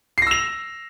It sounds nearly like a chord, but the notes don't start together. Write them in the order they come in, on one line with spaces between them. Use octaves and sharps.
C7 A#6 E6 F7